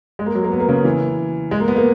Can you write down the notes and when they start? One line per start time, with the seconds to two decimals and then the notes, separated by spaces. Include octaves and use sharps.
0.19 G#3
0.26 A#3
0.35 F#3
0.44 A#3
0.52 B3
0.60 A#3
0.69 C#3
0.85 E3
1.51 G#3
1.60 A#3
1.68 B3
1.76 A#3